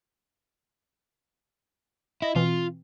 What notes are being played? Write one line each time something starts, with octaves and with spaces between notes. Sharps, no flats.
E4 D#5
B2 E3 C4 F4